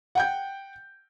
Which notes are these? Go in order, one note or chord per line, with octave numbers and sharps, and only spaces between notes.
F#5 G5 G6